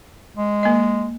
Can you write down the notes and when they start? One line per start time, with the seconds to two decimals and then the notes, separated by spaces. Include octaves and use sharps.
0.36 G#3
0.63 A#3 D#5